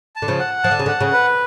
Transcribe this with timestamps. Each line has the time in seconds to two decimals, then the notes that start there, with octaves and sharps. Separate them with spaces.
0.16 A5
0.22 D3
0.28 C#3 F3
0.40 F#5
0.64 F3 A5
0.71 D3
0.79 C#3
0.86 D3 F#5
1.01 C#3
1.13 B4